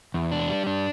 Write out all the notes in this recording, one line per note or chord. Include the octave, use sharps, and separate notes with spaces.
E2
D4
G3
D4